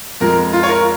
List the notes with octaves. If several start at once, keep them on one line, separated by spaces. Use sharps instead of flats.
F2 F3 G#3 A#4
F4
C#5
A#4